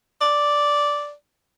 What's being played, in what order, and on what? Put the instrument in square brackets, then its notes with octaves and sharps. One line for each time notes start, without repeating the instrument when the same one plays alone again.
[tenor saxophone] D5